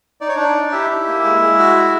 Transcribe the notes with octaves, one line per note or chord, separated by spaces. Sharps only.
D#4 D5
C#5
D4 D#4 D5
D#4
E4 G4 E5
G4
A#3
G#3
G#3
F#4
G#3